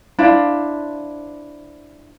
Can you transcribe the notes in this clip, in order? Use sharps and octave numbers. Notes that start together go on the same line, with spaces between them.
D4 E4 C5 F5